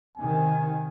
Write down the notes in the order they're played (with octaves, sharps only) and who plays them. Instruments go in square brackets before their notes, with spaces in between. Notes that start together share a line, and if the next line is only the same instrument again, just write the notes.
[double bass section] C3 D#3 [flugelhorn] G#5